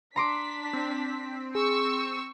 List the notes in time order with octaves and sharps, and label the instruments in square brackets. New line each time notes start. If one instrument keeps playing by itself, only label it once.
[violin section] D4 B6 [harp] A#5 C6 D6
[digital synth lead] C4
[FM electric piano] G#4 [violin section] C#6 E6